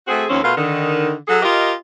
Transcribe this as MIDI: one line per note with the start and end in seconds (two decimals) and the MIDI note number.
0.08 0.24 57
0.08 0.24 60
0.08 0.24 66
0.08 0.24 68
0.29 0.42 39
0.29 0.42 53
0.29 0.42 60
0.29 0.42 61
0.43 0.53 47
0.43 0.53 57
0.43 0.53 65
0.43 0.53 70
0.43 0.53 77
0.57 1.14 50
0.57 1.14 51
1.28 1.41 54
1.28 1.41 68
1.28 1.41 69
1.42 1.72 65
1.42 1.72 67
1.42 1.72 70
1.42 1.72 75